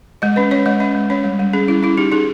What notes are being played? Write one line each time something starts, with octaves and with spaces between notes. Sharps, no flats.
G#3 D#5
C#4 B4
C#4 C#5
G#3 D#5
C#4 E5
G#3
C#4 C#5
G3
G3
C#4 G#4
C#4 E4
C#4 E4
D#4 G4
D#4 G#4